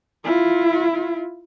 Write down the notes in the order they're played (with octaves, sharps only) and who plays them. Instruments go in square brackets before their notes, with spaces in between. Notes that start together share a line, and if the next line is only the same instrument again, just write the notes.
[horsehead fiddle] E4 F4